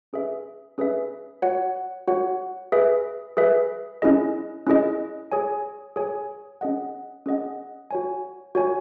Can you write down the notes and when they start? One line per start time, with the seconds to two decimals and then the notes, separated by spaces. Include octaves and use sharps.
0.13 C#4 G#4 B4 E5
0.78 C#4 G#4 B4 E5
1.42 F#4 C#5 F#5
2.08 F#4 C#5 F#5
2.72 G#4 B4 E5
3.37 G#4 B4 E5
4.02 C#4 E4 G#4 D#5
4.67 C#4 E4 G#4 D#5
5.32 G#4 C#5 G#5
5.96 G#4 C#5 G#5
6.61 C#4 G#4 D#5 F#5
7.26 C#4 G#4 D#5 F#5
7.91 F#4 C#5 G#5
8.55 F#4 C#5 G#5